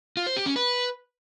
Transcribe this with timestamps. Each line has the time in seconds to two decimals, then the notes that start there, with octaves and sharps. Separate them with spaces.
0.17 F4
0.27 C5
0.36 G4
0.46 C#4
0.56 B4